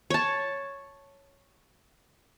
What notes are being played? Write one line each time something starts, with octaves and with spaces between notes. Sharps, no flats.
C#5 A5